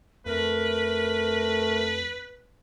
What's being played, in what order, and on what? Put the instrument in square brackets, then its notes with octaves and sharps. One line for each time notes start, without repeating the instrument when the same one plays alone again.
[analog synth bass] F2 [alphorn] A3 [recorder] A#4 [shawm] B4